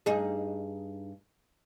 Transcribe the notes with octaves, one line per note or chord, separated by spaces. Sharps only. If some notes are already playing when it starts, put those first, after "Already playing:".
G2 D#4 G#4